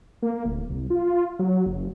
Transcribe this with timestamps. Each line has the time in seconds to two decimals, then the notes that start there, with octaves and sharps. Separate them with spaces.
0.22 A#3
0.45 D1
0.70 C2
0.90 F4
1.39 F#3
1.66 F#1